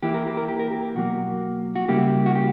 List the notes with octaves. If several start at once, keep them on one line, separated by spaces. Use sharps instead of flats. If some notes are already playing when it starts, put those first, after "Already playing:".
E3 A#3 E4 G4
A#4
G4
A#4
G4
A#4
G4
B2 F#3 A#3 F#4
F#4
C#3 G3 A#3 E4 G4
F#4
G4